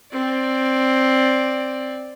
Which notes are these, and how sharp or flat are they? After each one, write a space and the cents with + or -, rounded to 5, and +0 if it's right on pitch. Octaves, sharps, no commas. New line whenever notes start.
C4 +10 D5 +0